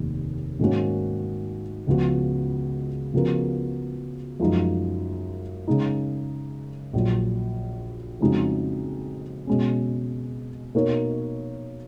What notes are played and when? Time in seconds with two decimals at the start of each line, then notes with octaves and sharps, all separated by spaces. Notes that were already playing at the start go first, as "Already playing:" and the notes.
Already playing: F1 D#2 D#3
0.59 G#2 D#3 A#3 C#4 F#4
1.87 C#2 C#3 F3 B3 F#4
3.14 C#3 F3 B3 F#4 A#4
4.40 F#2 F3 G#3 D#4 F#4
5.67 C#3 G#3 D#4
6.93 A#1 A#2 F#3
8.20 F2 C#3 G#3 D#4 F#4
9.47 B2 G#3 C#4
10.75 B2 A#3 D#4 A#4 C#5